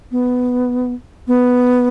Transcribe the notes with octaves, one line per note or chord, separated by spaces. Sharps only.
B3
B3